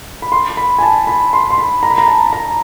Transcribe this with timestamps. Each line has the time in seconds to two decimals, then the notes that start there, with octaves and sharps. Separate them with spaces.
0.22 B5
0.32 C6
0.57 B5
0.79 G#5
0.82 A5
1.07 B5
1.33 C6
1.50 C6
1.58 B5
1.83 A#5
1.90 B5
1.98 A#5
2.08 A5
2.33 A#5